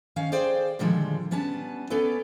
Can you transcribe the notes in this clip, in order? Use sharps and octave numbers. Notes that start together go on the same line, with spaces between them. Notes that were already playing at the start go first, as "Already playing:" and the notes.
D#3 C#4 C#5 F5
G#4 C5 D5 F5 G5
A#2 D3 D#3 F3 G3 G#3
G3 B3 C#4 D4 A5
B3 C#4 A4 B4 D5